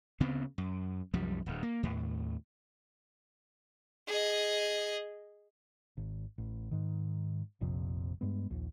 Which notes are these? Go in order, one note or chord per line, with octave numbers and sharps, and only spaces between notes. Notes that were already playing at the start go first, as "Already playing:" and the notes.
D2 C#3 B3 C4
F#2
C2 F#2 F3 G3
D1 D2
A#3
D#2 A2
G#4 D#5
G#1
A1
G#2 D#3
F1 A#1 F2 C3
G2 G#3 B3
A#1 D#2